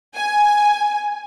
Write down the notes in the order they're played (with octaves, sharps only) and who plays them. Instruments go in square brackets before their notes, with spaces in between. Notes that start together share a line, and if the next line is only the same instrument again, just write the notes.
[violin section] G#5